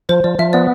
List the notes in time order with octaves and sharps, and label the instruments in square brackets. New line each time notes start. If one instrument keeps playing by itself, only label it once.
[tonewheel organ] F3 [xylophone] C5
[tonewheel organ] F3 [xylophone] D5
[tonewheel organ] F3 [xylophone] E5
[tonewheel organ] B3 [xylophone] D5